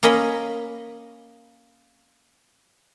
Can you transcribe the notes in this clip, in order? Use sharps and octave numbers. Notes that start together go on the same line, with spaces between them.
A#3 C#4 D#5 B5